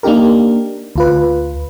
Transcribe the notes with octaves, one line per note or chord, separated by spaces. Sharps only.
A#3 D4 D#4 G4 A#4
D2 F4 B4